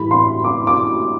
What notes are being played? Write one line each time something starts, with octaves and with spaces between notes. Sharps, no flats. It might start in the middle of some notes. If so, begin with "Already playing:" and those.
Already playing: A2 E3 G3 B5
C6
D6
D6